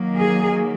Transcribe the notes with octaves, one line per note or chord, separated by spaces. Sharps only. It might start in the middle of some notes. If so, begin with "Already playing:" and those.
Already playing: D#3 F#3 A#3
G#4